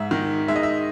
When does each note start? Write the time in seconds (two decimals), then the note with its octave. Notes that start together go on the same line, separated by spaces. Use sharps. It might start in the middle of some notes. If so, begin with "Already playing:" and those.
Already playing: G#2 E5
0.11 D#3
0.48 G#3 E5
0.56 D#5
0.63 E5